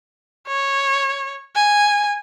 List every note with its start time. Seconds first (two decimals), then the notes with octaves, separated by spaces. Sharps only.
0.47 C#5
1.56 G#5